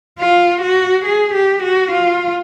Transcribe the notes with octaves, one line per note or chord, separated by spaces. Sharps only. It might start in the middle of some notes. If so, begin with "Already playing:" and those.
F4
F#4
G#4
G4
F#4
F4